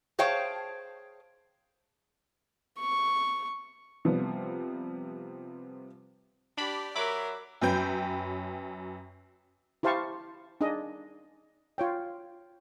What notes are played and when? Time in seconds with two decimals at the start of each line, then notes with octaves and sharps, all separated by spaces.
0.19 G#4 C5 C#5 F5 G5 A5
2.80 C#6
4.05 C3 F3 G3 B3
6.58 D4 G4 D5 B5
6.96 F#3 A#4 E5 B5 D6
7.61 F#2 F#3 B4 G5 G6
9.83 E4 G4 C5 F5 A5 C#6
10.61 D4 D#4 G#4 D#5
11.78 F4 C#5 G5